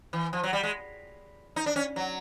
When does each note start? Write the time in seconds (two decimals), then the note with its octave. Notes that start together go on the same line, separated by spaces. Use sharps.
0.13 E3
0.33 F3
0.43 F#3
0.53 G3
0.63 G#3
1.56 D#4
1.66 D4
1.76 C#4
1.96 F#3